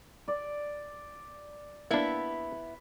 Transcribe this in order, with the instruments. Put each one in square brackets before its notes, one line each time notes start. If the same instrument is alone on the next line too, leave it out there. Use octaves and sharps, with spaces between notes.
[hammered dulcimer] D5
[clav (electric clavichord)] A#3 D4 [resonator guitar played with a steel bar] B3 E4 E5 [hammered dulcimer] B4 A5